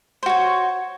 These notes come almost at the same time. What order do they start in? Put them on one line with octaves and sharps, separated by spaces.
C5 F#4 C#5